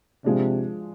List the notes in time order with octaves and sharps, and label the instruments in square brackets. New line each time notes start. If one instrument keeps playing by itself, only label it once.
[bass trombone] C3 [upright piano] F3 G#3 D4